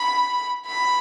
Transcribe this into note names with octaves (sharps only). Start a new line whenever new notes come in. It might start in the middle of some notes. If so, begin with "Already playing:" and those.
Already playing: B5
B5